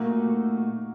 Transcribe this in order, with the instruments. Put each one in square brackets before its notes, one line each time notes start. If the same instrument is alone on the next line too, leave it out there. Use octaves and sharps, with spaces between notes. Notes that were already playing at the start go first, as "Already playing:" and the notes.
Already playing: [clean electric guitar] A#2 A3 D#4 F#4 [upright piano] A#3